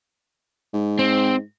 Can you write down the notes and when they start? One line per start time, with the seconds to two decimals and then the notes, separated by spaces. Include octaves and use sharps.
0.74 G#2
0.99 C4